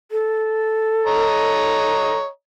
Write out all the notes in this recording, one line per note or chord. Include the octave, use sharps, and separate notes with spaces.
A4
C#5 D#5 A#5